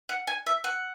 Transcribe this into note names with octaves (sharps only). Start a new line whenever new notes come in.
F#5
G#5
E5
F#5